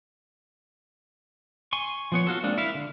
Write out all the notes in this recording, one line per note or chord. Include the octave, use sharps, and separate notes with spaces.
G#5 C6 C#6
F3 B3 C#5
F4 F#4 A4
G#3 A#3 C4 D4
E4 F5
D3